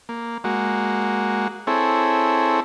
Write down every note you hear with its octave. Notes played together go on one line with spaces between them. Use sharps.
A#3
G#3 A#3 F#4
C4 E4 G#4 A4 C#5